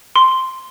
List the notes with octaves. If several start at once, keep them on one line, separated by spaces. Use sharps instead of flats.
C6